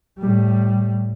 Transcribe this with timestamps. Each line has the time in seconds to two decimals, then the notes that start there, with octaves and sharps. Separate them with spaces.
0.19 A2 G3